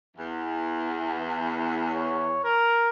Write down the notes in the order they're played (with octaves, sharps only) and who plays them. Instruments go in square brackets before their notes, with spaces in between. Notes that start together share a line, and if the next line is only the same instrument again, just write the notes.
[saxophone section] E2
[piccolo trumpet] C#5
A#4